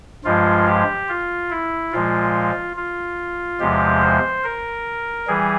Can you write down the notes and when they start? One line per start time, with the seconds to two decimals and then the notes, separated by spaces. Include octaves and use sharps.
0.24 G2 F3 G#3 F4
0.67 G4
1.09 F4
1.50 E4
1.92 A#2 F3 G#3 F4
2.76 F4
3.60 E2 C3 F3 G#3 G4
4.02 C5
4.44 A#4
5.28 E3 G3 G#4